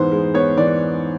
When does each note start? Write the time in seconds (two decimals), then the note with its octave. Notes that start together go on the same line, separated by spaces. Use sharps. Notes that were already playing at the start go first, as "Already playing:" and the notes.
Already playing: G#2 E3 B3 C5
0.12 G#3
0.34 B3 C#5
0.57 E3 D5